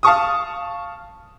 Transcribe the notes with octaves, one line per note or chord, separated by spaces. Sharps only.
F5 A5 C#6 D#6